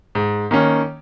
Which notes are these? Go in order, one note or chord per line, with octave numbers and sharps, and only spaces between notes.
G#2
D#3 A#3 C#4